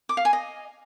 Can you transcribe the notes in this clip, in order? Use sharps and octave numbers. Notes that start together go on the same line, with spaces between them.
D6
F5
G#5
D#5